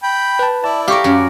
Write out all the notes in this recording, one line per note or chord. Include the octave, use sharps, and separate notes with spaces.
G5 B5
B4 A5
E4 D5 A5
G4 A#4 F5 C#6
F#2